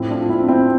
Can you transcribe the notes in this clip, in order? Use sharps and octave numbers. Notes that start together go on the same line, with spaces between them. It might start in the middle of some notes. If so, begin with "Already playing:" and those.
Already playing: A2 F3 C4 E4
D4 F4
C4 E4
C4 E4